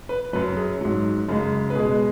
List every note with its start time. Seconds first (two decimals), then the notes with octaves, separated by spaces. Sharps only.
0.09 B4
0.33 F#2 F#3 B4
0.56 G#4
0.81 G#2 F#3
1.29 F#2 C#3 G#3
1.70 B4
1.75 B2 G#3 G#4